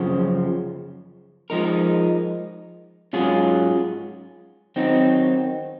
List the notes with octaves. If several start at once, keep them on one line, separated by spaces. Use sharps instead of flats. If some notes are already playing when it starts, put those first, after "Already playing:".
Already playing: F#2 C#3 F3
F3 G#3 D#4 A#4
G#2 F#3 C#4 F4 G#4
D#3 F#3 C4 D#4